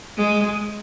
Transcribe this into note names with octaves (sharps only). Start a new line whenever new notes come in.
G#3